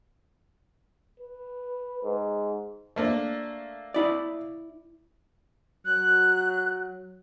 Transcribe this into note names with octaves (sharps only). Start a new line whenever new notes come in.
B4
G#2
A3 A#3 D4
E4 D5
F#3 F#6